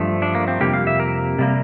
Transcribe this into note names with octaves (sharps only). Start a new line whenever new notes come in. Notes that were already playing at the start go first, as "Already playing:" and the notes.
Already playing: G2 F3 A3
D4
A#3
C4
F2 C3 G3 A#3 G4
F5
E5
A#4
C3 G3 A#3